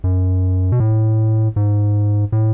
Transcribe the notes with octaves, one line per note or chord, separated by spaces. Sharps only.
F#2
B2
A2
G#2
A2